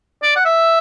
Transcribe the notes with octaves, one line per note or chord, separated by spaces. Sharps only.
D5
F#5
E5